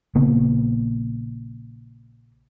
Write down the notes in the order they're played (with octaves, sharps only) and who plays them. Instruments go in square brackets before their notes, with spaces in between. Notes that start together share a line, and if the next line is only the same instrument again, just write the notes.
[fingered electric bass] A#1 C#3 A#3 B3